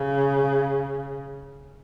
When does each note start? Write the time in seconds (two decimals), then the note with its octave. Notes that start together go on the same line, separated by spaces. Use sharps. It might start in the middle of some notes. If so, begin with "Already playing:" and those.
Already playing: C#3